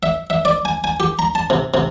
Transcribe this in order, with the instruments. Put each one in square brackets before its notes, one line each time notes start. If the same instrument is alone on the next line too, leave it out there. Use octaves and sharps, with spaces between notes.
[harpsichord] E5
E5
D5
G#5
G#5
G4
A#5
A5
C3
C3